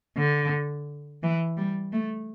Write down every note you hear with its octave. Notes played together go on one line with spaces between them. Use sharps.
D3
E3
G3
A3